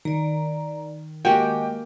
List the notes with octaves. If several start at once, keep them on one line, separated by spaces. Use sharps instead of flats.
D#3 D5 A#5
G#3 A#3 F#4 G4 D#5 G5